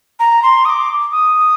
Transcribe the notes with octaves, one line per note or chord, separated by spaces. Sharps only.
A#5
C6
D#6
D6
D#6